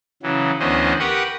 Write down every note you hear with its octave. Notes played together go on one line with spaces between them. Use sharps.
C#3 E3 F#3
D2 E3 B3 C#4 C5 D#5
G4 A#4 B4 F#5 C#6 D#6